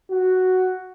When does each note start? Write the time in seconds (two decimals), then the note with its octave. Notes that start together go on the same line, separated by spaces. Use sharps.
0.10 F#4